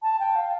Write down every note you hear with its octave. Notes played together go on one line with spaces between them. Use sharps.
A5
G5
F5